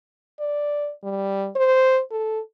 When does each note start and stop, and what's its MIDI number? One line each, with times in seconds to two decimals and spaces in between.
0.39 0.91 74
1.04 1.48 55
1.55 2.02 72
2.10 2.40 69